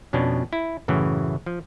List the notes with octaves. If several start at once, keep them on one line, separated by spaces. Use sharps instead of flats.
F2 B2 C#4 D4
E4
F#2 A2 C#3 E3
F3